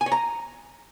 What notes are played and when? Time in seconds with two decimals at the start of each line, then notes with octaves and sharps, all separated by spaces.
0.01 G#5
0.06 C#5
0.12 A#5